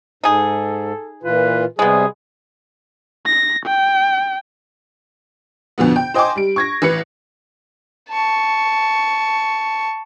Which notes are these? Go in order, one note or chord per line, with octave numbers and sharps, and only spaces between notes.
G#2 D#4 G#4 A4
A#2 E3 F4 B4
C3 G3 G#3 B3 G#4
A#6
G5
F2 B2 D3 B3
G5
C5 D#5 G5 G#5 C6 D6
G3 D7
C#6 G#6 A#6
A1 B4 C#7
A5 C#6